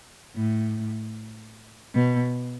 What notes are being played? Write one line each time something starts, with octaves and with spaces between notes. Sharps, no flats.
A2
B2